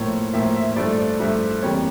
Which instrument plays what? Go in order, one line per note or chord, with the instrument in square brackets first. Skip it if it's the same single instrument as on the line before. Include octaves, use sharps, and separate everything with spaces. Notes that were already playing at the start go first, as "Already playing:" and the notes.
Already playing: [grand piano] A2 F3 A#3 C#5
A2 F3 A#3 E5
E5
G2 F3 A3 D5
D5
G2 F3 A3 E5
F2 C#3 E3 G3 A#3 C#5